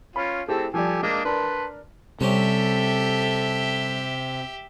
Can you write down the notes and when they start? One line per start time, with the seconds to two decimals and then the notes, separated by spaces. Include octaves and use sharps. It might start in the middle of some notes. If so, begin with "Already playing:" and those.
0.16 C#4 F4 B5
0.48 A3 C4 E4 G4 G#4
0.74 F3 G3 G4 A4 D5 G#5
1.03 G#3 A#3 D4 D#5
1.25 D4 A#4 B4 A5 C6
2.21 C3 G3 C4 C#4 G4 A4 E5